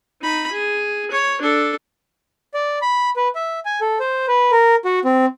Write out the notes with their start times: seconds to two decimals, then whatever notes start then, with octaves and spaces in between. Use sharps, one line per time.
0.21 D#4 B5
0.52 G#4
1.11 C#5
1.41 D4 A4
2.54 D5
2.82 B5
3.16 B4
3.35 E5
3.65 G#5
3.81 A4
4.00 C5
4.28 B4
4.52 A#4
4.85 F#4
5.05 C4